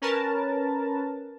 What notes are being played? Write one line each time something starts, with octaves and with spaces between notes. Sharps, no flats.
C#4 A#4 B4 A5